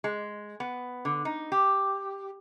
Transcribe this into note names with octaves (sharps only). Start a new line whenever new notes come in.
G#3
B3
D3
D#4
G4